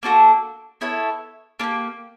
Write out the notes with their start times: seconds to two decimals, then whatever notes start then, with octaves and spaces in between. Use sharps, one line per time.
0.03 A#3 D4 F#4 A4
0.81 B3 E4 A4 C#5
1.60 A#3 D4
1.63 G4